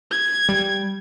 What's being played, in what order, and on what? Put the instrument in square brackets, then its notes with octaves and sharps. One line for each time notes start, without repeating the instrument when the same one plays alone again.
[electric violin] G#6
[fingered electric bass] G3